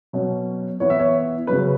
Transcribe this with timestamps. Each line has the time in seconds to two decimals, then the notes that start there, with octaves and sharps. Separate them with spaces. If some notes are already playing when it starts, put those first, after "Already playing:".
0.13 B2 F#3 C#4
0.80 E3 B3 E4 C#5
0.90 E5
1.00 C#5
1.47 C#3 F#3 C#4 B4